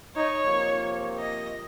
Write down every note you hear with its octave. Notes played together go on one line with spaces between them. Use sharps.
D#4 C#5
C3 F3 A#3
D#5